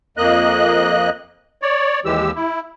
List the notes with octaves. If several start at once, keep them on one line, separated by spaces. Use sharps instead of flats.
F2 A#3 D#5 F#6
C#5 D5
D#2 E3 G#3 G4 E6
E4